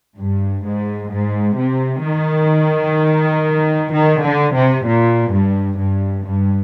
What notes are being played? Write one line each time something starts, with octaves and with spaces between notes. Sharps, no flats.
G2
G#2
G#2
C3
D#3
D#3
D3
C3
A#2
G2
G2
G2